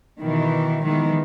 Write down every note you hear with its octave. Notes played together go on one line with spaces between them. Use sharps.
B2 D#3 E3
D#3 E3 G#3 B3